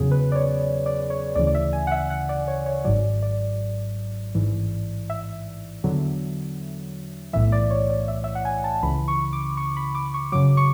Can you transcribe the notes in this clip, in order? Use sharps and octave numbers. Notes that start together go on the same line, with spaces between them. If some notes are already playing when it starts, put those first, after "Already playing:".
Already playing: E2 C#3 F#3 G#4
B4
D5
C#5
D5
C#5
D2 C#3 E3 D5
D5
E5
G#5
F#5
E5
F#5
D5
C#5
C#5
G#1 G#2 F#3 D5
D5
A1 G#2 E3
E5
E2 D3 F#3
B1 A2 E3 E5
D5
C#5
D5
E5
E5
F#5
G#5
A5
C#2 C#3 E3 B5
C#6
D6
C#6
B5
D6
C#6
F#2 C#3 F#3 D6
C#6